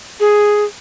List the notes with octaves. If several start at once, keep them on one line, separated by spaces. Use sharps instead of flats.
G#4